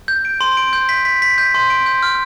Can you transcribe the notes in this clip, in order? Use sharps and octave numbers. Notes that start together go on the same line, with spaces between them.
G6
D7
C6
D7
G6
B6
B6
B6
G6
C6
D7
G6
F6